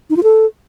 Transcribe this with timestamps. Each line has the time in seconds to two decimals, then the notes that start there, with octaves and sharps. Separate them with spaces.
0.10 D#4
0.17 F4
0.23 A4